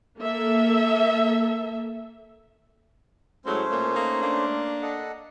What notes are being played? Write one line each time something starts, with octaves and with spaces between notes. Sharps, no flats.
A#3 A4 E5
A2 F#3 G#3 A3 C#4 C5
A#2 A#3
A#3 D#4
A#3 D4
A4 D#5 F#5